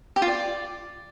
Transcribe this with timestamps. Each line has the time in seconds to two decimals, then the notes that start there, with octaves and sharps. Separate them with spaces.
0.16 G4
0.22 F4
0.28 D5